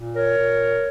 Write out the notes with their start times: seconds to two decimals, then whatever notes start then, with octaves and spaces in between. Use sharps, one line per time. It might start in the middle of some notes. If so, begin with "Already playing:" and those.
Already playing: A#2
0.16 A#4 C#5
0.38 A#2